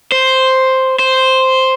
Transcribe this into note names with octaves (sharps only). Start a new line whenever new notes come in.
C5
C5